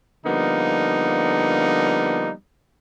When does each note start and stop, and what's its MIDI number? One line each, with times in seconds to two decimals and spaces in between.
0.26 2.30 50
0.26 2.30 53
0.26 2.30 55
0.26 2.30 58
0.26 2.30 59
0.26 2.30 63